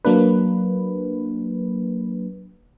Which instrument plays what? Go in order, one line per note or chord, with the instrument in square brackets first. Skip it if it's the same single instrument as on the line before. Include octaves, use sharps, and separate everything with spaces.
[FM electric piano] F#3 A#3 D4 B4